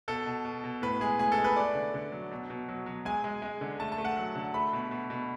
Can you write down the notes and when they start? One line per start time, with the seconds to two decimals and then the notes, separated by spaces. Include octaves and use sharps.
0.08 B2 A4
0.26 B2
0.45 B2
0.64 B2
0.82 A2 B4
1.01 G#3 G#4
1.19 A2 G#4
1.32 A4
1.38 G#3
1.44 B4
1.56 A3 D5
1.75 D3
1.94 D3
2.12 F#3
2.31 B2
2.50 B2
2.69 F#3
2.86 F#3
3.05 G#3 G#5
3.24 G#3
3.42 G#3
3.61 D3
3.80 A3 A5
3.92 A5
3.98 A3
4.05 F#5
4.17 F#3
4.36 D3
4.54 A3 B5
4.73 B2
4.91 B2
5.10 B2